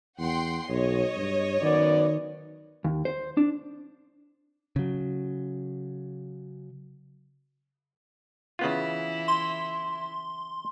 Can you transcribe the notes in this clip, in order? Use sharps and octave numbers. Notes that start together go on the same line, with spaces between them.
E2 F#5 G5 C6
B1 C#5 D#5
G2
F#2 D#3 B3 D5
D#2
C5
D4
C#3 F#3
C#3 E3 B3 E4 F4
C6